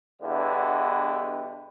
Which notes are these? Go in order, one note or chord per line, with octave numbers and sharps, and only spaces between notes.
E2 G2 B2 D3 E4